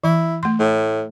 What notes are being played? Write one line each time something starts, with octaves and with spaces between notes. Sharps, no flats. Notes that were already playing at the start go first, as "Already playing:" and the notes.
E3 E4
A3 C6
A2